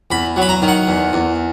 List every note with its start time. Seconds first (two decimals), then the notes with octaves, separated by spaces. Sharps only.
0.11 E2 B5
0.36 F#3
0.42 B5
0.49 A#5
0.62 D#3
0.68 F#5
0.87 E2
1.13 E2